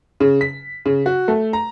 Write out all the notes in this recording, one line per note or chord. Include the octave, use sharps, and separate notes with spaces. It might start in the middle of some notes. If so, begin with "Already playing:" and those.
C#3
B6
C#3
F#4
A3
A#5